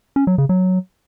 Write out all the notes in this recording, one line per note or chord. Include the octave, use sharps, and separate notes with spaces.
C#4
F#3
C#3
F#3